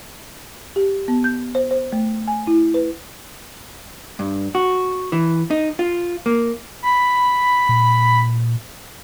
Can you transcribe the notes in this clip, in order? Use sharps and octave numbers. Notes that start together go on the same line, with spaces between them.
G4
B3
G6
C5
C5
A3
G#5
E4
B4
G2
F#4
E3
D#4
F4
A#3
B5
A#2